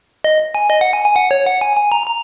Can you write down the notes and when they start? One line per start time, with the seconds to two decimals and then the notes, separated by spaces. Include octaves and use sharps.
0.24 D#5
0.55 G#5
0.70 D#5
0.81 F#5
0.93 G#5
1.04 G#5
1.16 F#5
1.31 C#5
1.46 F#5
1.61 G#5
1.77 G#5
1.92 A#5
2.07 A#5